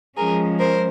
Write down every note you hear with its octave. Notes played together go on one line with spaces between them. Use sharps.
F3 G#3 C#4 G#4 A#4
A#4 C5